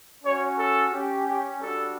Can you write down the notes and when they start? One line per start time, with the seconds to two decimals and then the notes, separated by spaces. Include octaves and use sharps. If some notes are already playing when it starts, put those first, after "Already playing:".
0.24 C#4 F#4 C#5
0.59 A4
0.92 C#4 G4
1.27 G4
1.61 G3 D4 F#4 A4